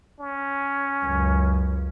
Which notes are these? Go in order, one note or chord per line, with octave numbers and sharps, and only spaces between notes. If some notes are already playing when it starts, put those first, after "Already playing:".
C#4
C#2 F#2